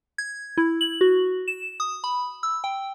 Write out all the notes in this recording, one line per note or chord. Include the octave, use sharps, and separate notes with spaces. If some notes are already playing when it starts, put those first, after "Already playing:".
G#6
E4
F#7
F#4
E7
D#6
B5
E6
G5